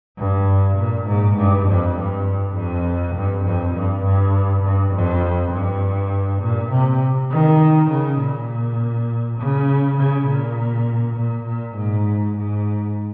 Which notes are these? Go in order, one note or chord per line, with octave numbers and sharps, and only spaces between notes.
G2
A#2
G#2
G2
F2
G2
F2
G2
F2
G2
G2
G2
F2
G2
A#2
C3
D#3
C#3
A#2
C#3
C#3
A#2
A#2
A#2
G#2
G#2